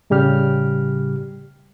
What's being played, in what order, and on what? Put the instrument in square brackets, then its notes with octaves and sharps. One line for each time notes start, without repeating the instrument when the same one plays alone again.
[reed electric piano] A2 C#3 G3 G4 F6